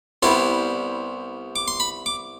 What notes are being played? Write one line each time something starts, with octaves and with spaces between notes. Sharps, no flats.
C2 C3 G3 B3 E4 C6
D6
C6
B5
D6